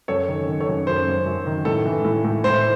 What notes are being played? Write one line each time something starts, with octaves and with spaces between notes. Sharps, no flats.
F#2 A4 C#5
D#3
D#3
A4 C#5
F#2
F#2 C5
F#2
F#2
D#3
A2 A4
E3
A2
A2
A2 C5